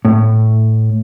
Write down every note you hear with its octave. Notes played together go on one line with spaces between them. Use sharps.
A2